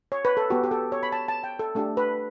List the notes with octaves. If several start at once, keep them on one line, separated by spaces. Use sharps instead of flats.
C#5
B4
A4
B3 F#4 G4
G4
A4
C#5
B5
A5
A5
G5
A4
A3 D4 G4 A4
B4